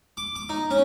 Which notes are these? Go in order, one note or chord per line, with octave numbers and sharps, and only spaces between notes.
D6
D6
D#4
C#4